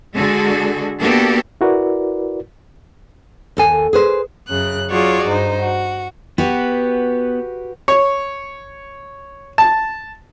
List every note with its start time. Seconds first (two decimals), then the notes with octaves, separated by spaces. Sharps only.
0.15 D3 G#3 F#4 G#4 A4
1.00 A#3 B3 D4 F#4 G4 A4
1.61 E4 F#4 A#4 B4 D5
3.57 D#2 A4 G#5
3.93 G#4 B4 C5
4.48 F#2 C#3 F#6
4.89 F#3 F4 F#4 G#4 C#5 D5
5.27 G2 D#4 C5
5.58 F#4
6.38 B3 F#4 G4 B4
7.88 C#5
9.58 A5